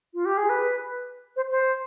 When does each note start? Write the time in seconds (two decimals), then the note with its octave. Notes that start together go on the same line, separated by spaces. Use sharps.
0.14 F4
0.25 G4
0.37 G#4
0.49 B4
1.36 C5
1.51 C5